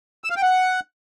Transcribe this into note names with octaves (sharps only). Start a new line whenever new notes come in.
E6
F5
G5
F#5